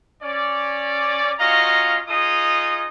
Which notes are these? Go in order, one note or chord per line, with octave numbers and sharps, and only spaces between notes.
C#4 D5
C#4 F4 F#4 D#5 F5 A#5
D#4 F4 G#4 D#5 D#6